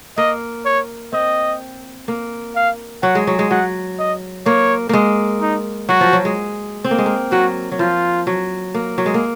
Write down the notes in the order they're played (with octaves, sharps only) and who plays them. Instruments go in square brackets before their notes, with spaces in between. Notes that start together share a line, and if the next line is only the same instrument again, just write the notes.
[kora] A#3 [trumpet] D#5
[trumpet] C#5
[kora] C4 [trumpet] D#5
[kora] A#3
[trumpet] F5
[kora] F#3 [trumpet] F#5
[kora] G#3
F#3
G#3
[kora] F#3 [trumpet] F#5
[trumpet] D#5
[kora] A#3 [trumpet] C#5
[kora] G#3 A#3
[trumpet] D#4
[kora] F#3 [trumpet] F#4
[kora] F3
F#3
G#3
C4
A#3
G#3
A#3
[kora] F#3 [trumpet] F#4
[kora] F#3
[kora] F3 [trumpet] F4
[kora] F#3
A#3
F#3
G#3
A#3